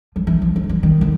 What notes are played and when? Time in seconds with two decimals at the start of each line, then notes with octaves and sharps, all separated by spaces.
0.16 F3
0.27 E3
0.42 F3
0.56 E3
0.64 D#3
0.69 E3
0.83 D#3
1.01 D3